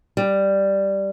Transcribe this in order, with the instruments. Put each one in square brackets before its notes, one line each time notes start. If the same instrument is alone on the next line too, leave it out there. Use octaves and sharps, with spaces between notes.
[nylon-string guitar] G3